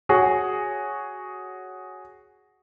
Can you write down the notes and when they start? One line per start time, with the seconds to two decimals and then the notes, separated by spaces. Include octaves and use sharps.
0.09 F#4 G#4 C#5